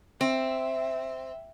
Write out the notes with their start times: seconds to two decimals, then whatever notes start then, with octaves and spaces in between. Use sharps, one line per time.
0.21 C4 E5